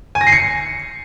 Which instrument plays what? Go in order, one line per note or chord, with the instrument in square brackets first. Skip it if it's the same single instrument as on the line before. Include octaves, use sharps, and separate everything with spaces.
[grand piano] G#5
A#6
C7
C#7